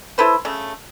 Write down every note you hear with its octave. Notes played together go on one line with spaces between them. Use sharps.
E4 A4 B4 C5
C#3 A3